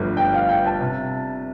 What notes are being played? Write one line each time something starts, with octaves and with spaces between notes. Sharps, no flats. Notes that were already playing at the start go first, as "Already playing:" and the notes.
Already playing: G1 G2 F3 A3
G5
F5
G5
A5
C3